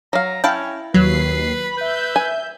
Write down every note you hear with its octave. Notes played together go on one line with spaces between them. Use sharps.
F#3 F5 A#5
C#4 E4 F5 G5 A5
D#2 F#3 B4 C7
B5
B4 E5 G6
G#5